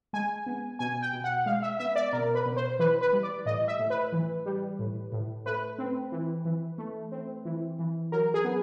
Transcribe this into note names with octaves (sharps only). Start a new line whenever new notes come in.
G#3 G#5
B3
B2 G#5
G5
B2
F#5
G#3 F5
E5
B3 E5
D5
B2 A#4
B4
B2
C5
E3 B4
B4
G3
D5
A2 D#5
E5
A2
B4
E3
G3
A2
A2
A3 B4
C4
E3
E3
A3
C4
E3
E3
F#3 A#4
G#4
B3